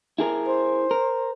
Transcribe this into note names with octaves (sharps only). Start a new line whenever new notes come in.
E4 G#4 A#4
C5
A#4